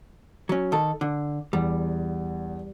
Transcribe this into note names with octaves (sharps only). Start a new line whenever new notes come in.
F#3 C#4
D#3 A4
D3
E2 G3